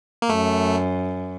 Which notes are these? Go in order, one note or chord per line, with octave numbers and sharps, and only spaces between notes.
A#3
F#2 A3